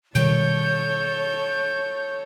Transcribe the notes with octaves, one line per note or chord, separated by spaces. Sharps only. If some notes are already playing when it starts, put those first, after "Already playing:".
B2 D#3 G3 A4 C#5 G6